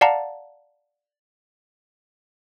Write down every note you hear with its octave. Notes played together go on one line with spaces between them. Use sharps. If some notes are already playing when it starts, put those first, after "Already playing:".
D5 F5 F#5 A5 A#5